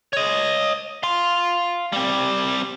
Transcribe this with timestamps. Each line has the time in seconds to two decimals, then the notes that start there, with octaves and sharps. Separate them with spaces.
0.13 C#5 D#5
1.03 F5 C6
1.93 G3 C4